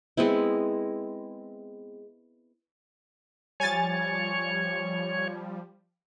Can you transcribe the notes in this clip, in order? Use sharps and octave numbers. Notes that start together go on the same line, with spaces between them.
G#3 B3 C4 E4
F3 G3 C#5 G#5 A6